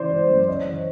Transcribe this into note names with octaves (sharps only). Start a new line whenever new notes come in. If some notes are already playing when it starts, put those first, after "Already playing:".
Already playing: C#3 E3 C5 D5
G#3
F#2
C#3 C#5 D#5
E3